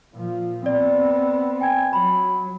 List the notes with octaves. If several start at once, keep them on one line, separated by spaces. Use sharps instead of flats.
A#2 F3
B3 C4 D5
G5 G#5 G#6
F#3 B5